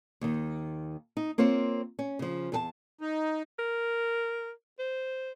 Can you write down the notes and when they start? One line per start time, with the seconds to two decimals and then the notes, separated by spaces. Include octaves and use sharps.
0.21 D#2 D#3
1.17 D#4
1.38 A#3 C4 F4 C5 C#5
1.99 C#4
2.19 C#3 F3
2.52 E2 G#4 A5
3.01 D#4
3.59 A#4
4.79 C5